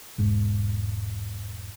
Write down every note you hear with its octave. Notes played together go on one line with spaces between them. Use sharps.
E1 G#2